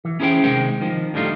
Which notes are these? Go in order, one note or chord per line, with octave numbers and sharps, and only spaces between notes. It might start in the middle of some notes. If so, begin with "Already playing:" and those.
E3
C#4 E4 G#4 C5 G5
C3 D#3 G#3 C5 G5
D#3 F3
A2 D3 G3 D#4 F4